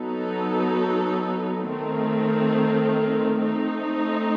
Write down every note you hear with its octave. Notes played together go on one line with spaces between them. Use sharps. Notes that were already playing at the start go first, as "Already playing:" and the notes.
Already playing: F#3 B3 D#4 A4
D#3 A3 C4
A3 C4 D#4